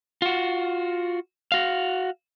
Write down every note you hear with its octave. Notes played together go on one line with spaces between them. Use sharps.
F4 F#4
F#4 F5